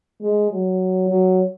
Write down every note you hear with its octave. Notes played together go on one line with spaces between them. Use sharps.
G#3
F#3
F#3